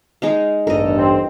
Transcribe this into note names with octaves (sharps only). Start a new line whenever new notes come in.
G#3 D#4 F5
A1 E2 G2 A4 A#4 D#5
C4